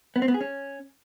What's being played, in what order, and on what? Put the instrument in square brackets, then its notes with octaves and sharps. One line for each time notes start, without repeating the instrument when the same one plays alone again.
[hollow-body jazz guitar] B3
C4
B3
G#4
C#4